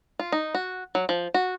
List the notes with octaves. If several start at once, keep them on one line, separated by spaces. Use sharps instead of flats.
F4
D#4
F#4
F#3
F3
F#4